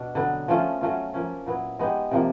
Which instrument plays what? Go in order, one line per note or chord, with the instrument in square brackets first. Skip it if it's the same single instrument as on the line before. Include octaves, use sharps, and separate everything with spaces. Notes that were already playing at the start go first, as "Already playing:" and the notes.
Already playing: [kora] B2 D4
D3 F#3 B3
F3 A3 C#4 F4
F#3 A3 C#4 F4
F3 A#3 C#4
A#2 F#3 B3 E4
G#3 B3 D#4 G4
C3 F3 A#3